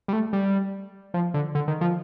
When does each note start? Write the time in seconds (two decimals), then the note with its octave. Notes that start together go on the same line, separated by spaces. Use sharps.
0.08 G3
0.13 A3
0.33 G3
1.14 F3
1.34 D3
1.55 D3
1.68 D#3
1.81 F3